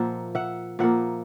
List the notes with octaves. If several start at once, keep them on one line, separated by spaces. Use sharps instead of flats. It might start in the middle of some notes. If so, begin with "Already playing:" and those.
Already playing: A#2 F3 A#3 E5 F#5
E5 F#5
A#2 F3 A#3 E5 F#5